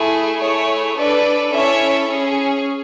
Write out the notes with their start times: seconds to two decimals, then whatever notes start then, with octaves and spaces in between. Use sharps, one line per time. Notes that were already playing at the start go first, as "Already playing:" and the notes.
Already playing: A3 E4 G#4
0.41 A3 E4 G#4 C#5
0.97 D4 A4 B4 D5
1.53 C#4 E4 A4 C#5 E5
2.08 C#4 G#4